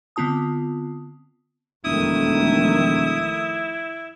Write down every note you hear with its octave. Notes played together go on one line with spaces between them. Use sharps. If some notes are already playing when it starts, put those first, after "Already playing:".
D3 B3 C4 F4 A5 D#6
E1 F2 D#3 A3 E4 D#6